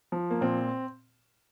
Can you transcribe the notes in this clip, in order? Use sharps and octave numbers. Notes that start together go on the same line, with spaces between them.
F3
A#3
A#2 C4